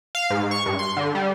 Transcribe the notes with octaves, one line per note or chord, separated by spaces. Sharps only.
F5
G#2
C#6
G2
C6
D3
G3